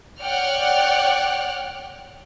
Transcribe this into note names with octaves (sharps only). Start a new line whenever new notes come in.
C#5 D5 F#5 G5 F6 F#6